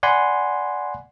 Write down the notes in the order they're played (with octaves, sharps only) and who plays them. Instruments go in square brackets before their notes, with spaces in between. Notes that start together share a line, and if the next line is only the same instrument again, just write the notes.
[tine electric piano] D5 F#5 G#5 B5 C6